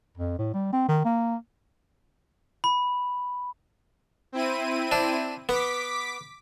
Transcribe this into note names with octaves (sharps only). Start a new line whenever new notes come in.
F2
A2
G3
C4
D#3
A#3
B5
C4 E4 D#7
D4
B3 D6 B6